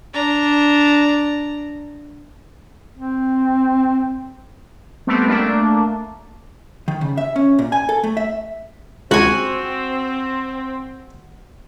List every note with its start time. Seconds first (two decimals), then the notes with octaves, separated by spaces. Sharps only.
0.14 D4 A#5
2.98 C4
5.07 G3 A3 B3 C4
5.27 A3 A#3 D4
6.88 D#3
7.01 C#3
7.17 E5
7.36 C#4
7.59 A#2
7.72 G#5
7.89 A4
8.03 A3
8.17 E5
9.11 C#2 C4 F#4 G#5